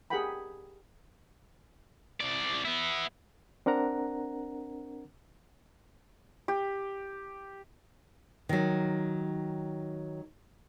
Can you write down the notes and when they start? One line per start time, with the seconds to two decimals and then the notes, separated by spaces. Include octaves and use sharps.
0.10 G4 G#4 A#4 F#5 G5 B5
2.21 C2 D5
2.65 B3 E4
3.66 C4 D4 A#4 F#5 A#5
6.48 G4
8.49 D#3 F#3